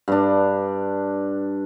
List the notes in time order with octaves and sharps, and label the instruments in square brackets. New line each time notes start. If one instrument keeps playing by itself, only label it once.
[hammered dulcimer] G2 D4